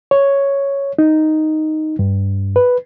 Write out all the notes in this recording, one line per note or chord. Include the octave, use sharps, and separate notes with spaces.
C#5
D#4
G2
B4